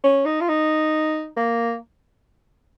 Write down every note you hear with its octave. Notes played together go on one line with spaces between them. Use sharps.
C#4
D#4
F4
D#4
A#3